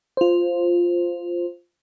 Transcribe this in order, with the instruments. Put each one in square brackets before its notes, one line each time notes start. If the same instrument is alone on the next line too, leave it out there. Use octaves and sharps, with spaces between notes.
[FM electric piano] F4 C5